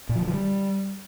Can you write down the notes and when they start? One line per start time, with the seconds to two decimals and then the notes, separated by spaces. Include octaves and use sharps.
0.09 A#2
0.15 F3
0.21 D3
0.28 F3
0.34 G3